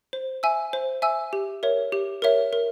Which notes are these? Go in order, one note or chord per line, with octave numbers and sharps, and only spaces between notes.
C5
E5 G#5 E6
C5
E5 G#5 E6
G4
A#4 C#5 E5
G4
A#4 C#5 E5
A#4